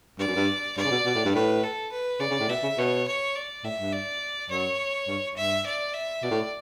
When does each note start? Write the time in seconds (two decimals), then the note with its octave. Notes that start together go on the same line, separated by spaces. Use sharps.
0.19 G2 D5
0.27 F#2
0.36 G2
0.77 G2 D5
0.85 C#3
0.91 B2
1.06 B2
1.15 A2
1.25 G2
1.34 A2 B4
1.63 A4
1.92 B4
2.20 C#3 D5
2.30 C#3
2.40 A2
2.49 B2 E5
2.63 C#3
2.78 B2 C#5
3.07 C#5
3.35 D5
3.64 A2 E5
3.78 G2
3.92 D5
4.50 F#2 C#5
5.08 G2
5.36 G2 E5
5.66 D5
5.93 E5
6.23 B2 D5
6.31 A2